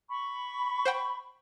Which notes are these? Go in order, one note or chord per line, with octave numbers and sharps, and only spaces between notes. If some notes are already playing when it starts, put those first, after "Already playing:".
B5 C#6
C5 F#5 G5